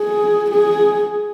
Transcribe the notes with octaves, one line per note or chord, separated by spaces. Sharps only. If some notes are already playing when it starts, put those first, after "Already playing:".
Already playing: G#4
G#4